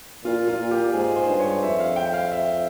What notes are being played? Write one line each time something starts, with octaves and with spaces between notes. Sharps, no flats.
A#2 F4
F4
A#2
G4
G#2 G#4
C5
G2
C#5
F2 E5
F5
G5
F5
E5